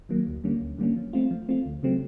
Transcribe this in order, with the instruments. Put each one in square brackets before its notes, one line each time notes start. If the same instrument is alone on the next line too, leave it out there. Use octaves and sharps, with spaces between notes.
[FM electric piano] D#3 F#3 A#3
D2
D3 G3 A#3 C#4
D2
D3 G3 A#3 C#4
F3
A3 C4 F4
F3
A3 C4 F4
D2
C#3 F#3 A3 C4